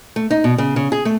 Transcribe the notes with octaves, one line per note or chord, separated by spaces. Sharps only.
A3
D#4
B2
C#3
C#3
G#4
A3